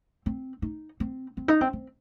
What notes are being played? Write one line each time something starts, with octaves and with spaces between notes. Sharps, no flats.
C4
D#4
C4
C4
D#4
C4
C4